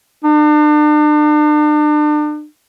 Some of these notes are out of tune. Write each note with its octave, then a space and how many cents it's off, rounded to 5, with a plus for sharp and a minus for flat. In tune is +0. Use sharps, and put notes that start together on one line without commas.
D4 +40